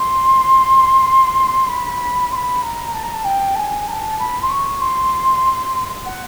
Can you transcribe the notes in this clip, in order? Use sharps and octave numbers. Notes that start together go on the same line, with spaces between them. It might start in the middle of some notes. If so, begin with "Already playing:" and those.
Already playing: C6
B5
C6
B5
A#5
A5
A#5
A5
G5
A5
G#5
A#5
A5
B5
C6
C#6
C6
F#5